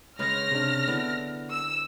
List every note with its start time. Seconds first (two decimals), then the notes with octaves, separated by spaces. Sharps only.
0.19 C#3 G#3 C#4 B4 C#6 F6 A#6
0.51 C3 D4
0.88 D3 B3 E4 D5
1.50 E6